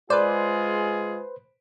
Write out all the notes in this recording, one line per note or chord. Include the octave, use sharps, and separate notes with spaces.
G#3 F4 G#4 B4 C5 D5